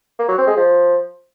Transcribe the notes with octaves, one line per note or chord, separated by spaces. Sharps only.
A#3
F#3
C4
G#3
F3